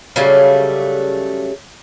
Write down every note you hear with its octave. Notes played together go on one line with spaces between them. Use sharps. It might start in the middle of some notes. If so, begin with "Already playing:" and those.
C#3 F#3 G3 A3